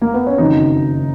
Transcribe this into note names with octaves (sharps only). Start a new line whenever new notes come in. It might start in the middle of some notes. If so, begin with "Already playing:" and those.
A#3
B3
C#4
F#1 F2 D#3 F#3 D#4